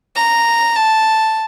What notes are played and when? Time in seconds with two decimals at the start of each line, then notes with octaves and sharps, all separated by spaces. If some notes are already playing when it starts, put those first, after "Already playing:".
0.16 A#5
0.75 A5